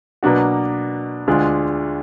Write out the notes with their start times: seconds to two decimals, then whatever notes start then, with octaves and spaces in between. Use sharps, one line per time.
0.23 B2 F#3 A#3 D4 F#4
1.27 D2 D3 G#3 D4 F4